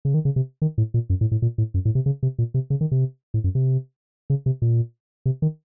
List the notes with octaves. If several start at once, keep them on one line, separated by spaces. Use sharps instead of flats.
C#3
D#3
C#3
C3
D#3
A2
A#2
F#2
A2
A2
A#2
A2
F#2
A2
C3
C#3
C3
A#2
C3
C#3
D#3
C3
A2
F#2
C3
C#3
C3
A#2
C3
D#3